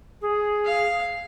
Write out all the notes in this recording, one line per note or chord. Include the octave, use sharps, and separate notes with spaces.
G#4
F5